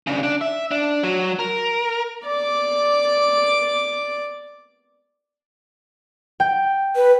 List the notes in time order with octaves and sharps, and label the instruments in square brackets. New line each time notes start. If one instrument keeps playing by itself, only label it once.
[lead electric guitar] C#3 D4
D4
E5
D4
F#3
A#4
[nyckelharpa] D5 D6
[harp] G5
[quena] B4